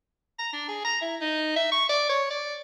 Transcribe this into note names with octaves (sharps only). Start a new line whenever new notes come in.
A#5
D4
G#4
A#5
E4
D#4
E5
C#6
D5
C#5
D5